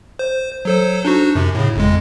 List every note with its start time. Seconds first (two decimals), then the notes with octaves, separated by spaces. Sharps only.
0.19 C5
0.65 F#3 A4 C5
1.05 D4 D#4 F#4
1.35 F#2 C3
1.55 A2 C#3
1.76 G1 F2 G#3